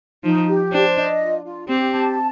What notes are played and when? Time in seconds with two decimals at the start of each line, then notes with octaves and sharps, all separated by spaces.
0.24 F3 D#4
0.48 G4
0.72 D4 C5
0.97 D#5
1.20 F4
1.45 F4
1.68 C4 G4
1.92 A5